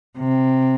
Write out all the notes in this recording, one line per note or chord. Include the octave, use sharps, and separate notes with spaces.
C3